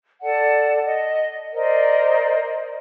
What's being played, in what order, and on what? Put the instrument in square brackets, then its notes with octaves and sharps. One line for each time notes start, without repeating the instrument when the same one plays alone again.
[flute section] A4 D5 F#5 A5
D#5
A#4 C5 D5 D#5